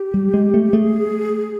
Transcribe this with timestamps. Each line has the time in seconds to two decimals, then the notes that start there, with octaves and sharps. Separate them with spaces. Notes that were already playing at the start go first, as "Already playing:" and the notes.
Already playing: G4
0.14 G3
0.34 G#3
0.54 A3
0.73 A3 G#4